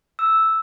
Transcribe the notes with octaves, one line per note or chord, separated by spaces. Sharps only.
E6